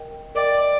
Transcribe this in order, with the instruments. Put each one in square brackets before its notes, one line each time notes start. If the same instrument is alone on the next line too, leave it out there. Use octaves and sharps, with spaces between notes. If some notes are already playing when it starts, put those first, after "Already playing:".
Already playing: [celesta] A#4 D#5 G5
[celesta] A#4 D#5 G5 [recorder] D5